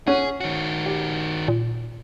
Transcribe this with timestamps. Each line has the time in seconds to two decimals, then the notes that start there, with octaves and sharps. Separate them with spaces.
0.07 C#4 G#4 F#5
0.40 D#3 F#4
0.86 G4
1.48 A#2